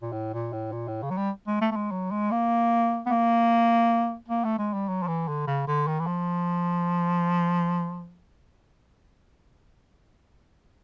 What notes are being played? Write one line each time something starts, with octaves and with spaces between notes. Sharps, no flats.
A#2
A2
A#2
A2
A#2
A2
C#3
F#3
G3
G#3
A3
A3
G#3
F#3
G#3
A#3
B3
A#3
A#3
A3
G#3
G3
F#3
F3
E3
D3
C#3
D3
D#3
E3
F3